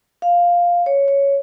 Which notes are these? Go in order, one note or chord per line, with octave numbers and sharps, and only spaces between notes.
F5
C#5
C#5